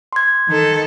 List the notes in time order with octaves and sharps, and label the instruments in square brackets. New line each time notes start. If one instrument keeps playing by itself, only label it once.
[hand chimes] C6 G#6
[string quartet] D#3 A4